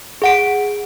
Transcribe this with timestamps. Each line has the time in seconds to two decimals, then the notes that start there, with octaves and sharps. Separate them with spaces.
0.22 G#4 F#5 D7